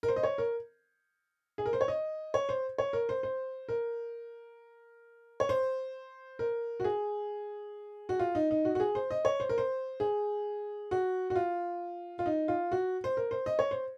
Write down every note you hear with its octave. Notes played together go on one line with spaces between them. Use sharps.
A#4
C5
D#5
C#5
A#4
G#4
A#4
C5
C#5
D#5
C#5
C5
C#5
A#4
C5
C5
A#4
C#5
C5
A#4
F#4
G#4
F#4
F4
D#4
D#4
F#4
F#4
G#4
C5
D#5
C#5
C5
A#4
C5
G#4
F#4
F#4
F4
F4
D#4
F4
F#4
C5
A#4
C5
D#5
C#5
C5